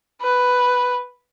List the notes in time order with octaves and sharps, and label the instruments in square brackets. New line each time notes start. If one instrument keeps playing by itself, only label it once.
[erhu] B4